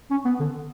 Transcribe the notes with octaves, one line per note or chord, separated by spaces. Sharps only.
C#4
B3
D3